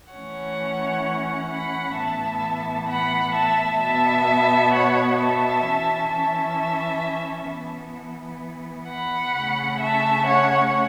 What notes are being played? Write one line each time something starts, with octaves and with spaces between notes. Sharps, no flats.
E3 A3 C#4 C#5 F#5
F#5 B5
A2 E3 B3 E5 A5
F#5 B5
E5 A5
B2 B3 E5 A5
C#5 F#5
E5 A5
E3 C#4
E5 A5
E3 B3
F#5 B5
C#3 A3 C#4
E5 A5
C#5 F#5